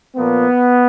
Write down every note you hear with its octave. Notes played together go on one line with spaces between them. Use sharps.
A#2 F3 A#3 B3